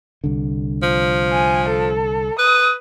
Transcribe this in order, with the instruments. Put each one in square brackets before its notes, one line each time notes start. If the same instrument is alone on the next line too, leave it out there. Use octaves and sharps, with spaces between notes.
[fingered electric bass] C2 D3
[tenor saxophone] F3
[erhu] G#5
A4
[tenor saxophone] B4 [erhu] D#6